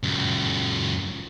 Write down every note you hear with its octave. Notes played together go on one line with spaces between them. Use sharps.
C#2 F#2